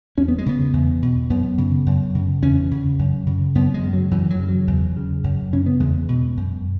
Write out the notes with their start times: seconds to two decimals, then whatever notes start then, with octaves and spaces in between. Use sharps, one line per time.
0.17 E2 C#4
0.28 B3
0.38 G#3
0.46 C#3 B3
0.73 E2
1.02 B2
1.30 F#2 B3
1.58 C#3
1.86 F#2
2.15 C#3
2.42 E2 C#4
2.71 C#3
2.99 F#2
3.27 C#3
3.55 F#2 B3
3.74 G#3
3.83 C#3
3.93 F#3
4.11 F#2 E3
4.30 F#3
4.39 C#3
4.49 F#3
4.67 E2
4.97 C#3
5.24 F#2
5.53 C#3 C#4
5.66 B3
5.80 E2 G#3
6.09 B2
6.37 F#2